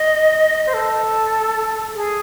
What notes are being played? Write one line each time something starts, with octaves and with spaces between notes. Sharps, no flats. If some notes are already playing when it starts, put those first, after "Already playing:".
Already playing: D#5
C5
A4
G#4